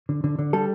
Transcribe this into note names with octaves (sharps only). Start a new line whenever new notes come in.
D3
D3
D3
G3 A4